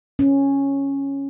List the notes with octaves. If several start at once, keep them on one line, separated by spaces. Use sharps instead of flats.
C#4